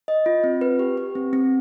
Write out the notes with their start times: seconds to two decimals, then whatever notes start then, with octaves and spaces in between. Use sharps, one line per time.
0.08 D#5
0.26 F4
0.44 C4
0.61 B4
0.79 G4
0.97 G4
1.15 C4
1.33 C4